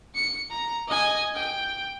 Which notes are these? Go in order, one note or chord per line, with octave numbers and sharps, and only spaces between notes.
C#7
A#5
D#5 G#5
G5